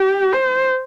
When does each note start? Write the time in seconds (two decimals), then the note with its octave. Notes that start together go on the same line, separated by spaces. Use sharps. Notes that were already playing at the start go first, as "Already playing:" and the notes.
Already playing: G4
0.33 C5